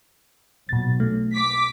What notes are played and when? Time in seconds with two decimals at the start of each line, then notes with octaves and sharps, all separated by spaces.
0.69 B1 A#2 A6
1.00 A3
1.35 D6 B6